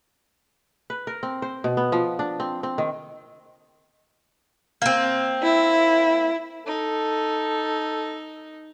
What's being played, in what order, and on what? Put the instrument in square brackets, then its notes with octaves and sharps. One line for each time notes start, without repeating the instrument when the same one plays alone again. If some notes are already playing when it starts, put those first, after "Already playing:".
[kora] B4
A#4
C4
C5
B2
B3
F3
D4
C4
C4
D#3
[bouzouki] A#3 C4
[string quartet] E4
[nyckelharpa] D#4 [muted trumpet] A4